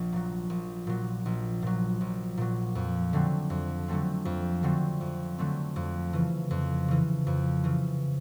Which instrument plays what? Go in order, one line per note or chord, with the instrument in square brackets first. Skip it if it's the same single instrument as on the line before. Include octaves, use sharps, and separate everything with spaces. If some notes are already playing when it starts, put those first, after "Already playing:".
Already playing: [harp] A#1
A#2 F#3
A#1
A#2 F#3
A#1
A#2 F#3
A#1
A#2 F#3
F2
D3 F#3 A3 C4
F2
D3 F#3 A3 C4
F2
D3 F#3 A3 C4
F2
D3 F#3 A3 C4
F2
C#3 E3
F2
C#3 E3
F2
C#3 E3